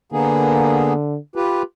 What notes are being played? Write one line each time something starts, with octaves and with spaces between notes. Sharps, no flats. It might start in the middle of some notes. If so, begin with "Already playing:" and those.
D3 A#3 B3 G#4
F4 G4 B4